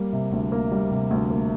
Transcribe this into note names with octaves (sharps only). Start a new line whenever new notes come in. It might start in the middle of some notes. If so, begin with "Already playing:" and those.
Already playing: G3 A#3
C3
D2
A#3
G3
C3
D2
A#3